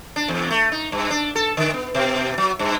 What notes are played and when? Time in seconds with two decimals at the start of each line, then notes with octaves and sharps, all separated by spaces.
0.16 D4
0.28 E2
0.51 A3
0.72 D#4
0.92 G2
1.10 D4
1.35 A4
1.57 D3
1.74 B3
1.95 B2
2.38 F#3
2.59 G2